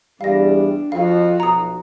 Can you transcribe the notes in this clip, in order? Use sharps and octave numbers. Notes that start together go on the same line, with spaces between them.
E2 G3 D4 F5 A#6
F2 F3 F#4 F5
B1 A#5 D#6